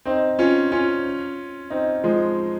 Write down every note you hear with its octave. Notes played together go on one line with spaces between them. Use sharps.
C4 D#4
C#4 F4
C#4 F4
C4 D#4
F3 G#3